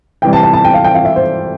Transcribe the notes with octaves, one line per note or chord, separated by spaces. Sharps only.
C3 E3 G3 G5
A5
A5
A5
G5
F5
G5
F5
E5
C5